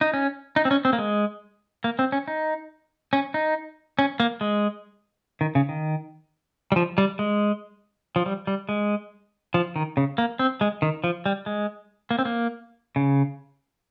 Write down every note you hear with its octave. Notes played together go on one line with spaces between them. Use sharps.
D#4
C#4
D#4
C4
C#4
C4
A#3
G#3
A#3
C4
C#4
D#4
C#4
D#4
C#4
A#3
G#3
D#3
C#3
D#3
G3
F3
G3
G#3
F3
G3
G3
G#3
F3
D#3
C#3
A#3
C4
G#3
D#3
F3
G3
G#3
A#3
C4
A#3
C#3